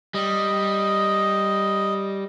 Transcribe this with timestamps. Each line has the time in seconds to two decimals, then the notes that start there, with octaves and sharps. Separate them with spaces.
0.14 G3 D#5